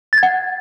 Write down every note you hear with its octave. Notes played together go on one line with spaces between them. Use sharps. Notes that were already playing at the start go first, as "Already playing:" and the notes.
A6
G#6
F#5